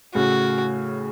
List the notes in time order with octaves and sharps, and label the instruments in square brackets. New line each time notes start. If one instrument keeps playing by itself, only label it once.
[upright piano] A2 C#3 [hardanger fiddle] F#4